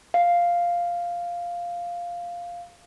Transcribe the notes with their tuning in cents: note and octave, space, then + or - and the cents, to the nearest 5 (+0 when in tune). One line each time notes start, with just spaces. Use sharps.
F5 +0